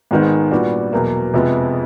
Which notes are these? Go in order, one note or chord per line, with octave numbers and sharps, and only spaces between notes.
G#1 G#2 D#3 G#3 B3
A#2 G3 B3 D4 F#4
E2 B2 F#3 A#3
F2 C3 F3 G#3 B3